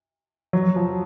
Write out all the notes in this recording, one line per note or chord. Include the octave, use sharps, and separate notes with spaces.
F#3
F3